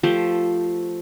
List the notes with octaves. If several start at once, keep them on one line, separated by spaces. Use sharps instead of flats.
F3 A3 G4 C5